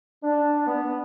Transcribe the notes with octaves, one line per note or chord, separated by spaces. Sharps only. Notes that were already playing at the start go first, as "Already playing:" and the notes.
D4
B3